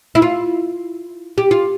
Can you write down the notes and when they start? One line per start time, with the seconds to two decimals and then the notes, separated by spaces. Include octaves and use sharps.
0.15 E4
0.22 F4
1.38 G4
1.51 F4